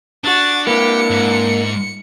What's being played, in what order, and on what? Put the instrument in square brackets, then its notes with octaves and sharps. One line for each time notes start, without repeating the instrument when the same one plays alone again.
[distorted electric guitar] D4 [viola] F#4 [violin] A6
[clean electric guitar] A#3 B4 [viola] D4 E4 [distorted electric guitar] G4 [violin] C#7
[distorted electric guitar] G#2